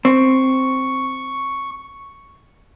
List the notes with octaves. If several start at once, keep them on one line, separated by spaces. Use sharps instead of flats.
C4 C#6